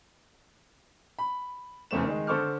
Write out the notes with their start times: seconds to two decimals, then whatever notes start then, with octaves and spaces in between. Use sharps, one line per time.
1.19 B5
1.91 F1 E2 C#3 A3 C5 E7
2.04 D#3 G#3
2.27 D3 A4 C5 C#6 D6 F6